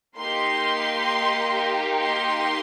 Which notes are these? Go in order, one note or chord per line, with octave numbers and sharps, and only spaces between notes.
A#3 D#4 G4 C6
C6